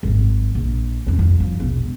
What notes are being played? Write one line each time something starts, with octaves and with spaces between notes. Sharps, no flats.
G#1 F#2
A#1
F2 C#4
F2
F#2 F3
E1 A#1